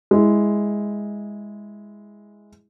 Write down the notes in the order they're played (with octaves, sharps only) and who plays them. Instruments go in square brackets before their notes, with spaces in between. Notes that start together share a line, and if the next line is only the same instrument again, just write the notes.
[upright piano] G#3 E4